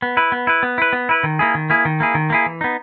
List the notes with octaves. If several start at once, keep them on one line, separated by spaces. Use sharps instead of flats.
B3
E4 B4
B3
E4 B4
B3
E4 B4
B3
E4 B4
D#3
A#3 E4 G#4
D#3
A#3 E4 G#4
D#3
A#3 E4 G#4
D#3
A#3 E4 G#4
E3
B3 D#4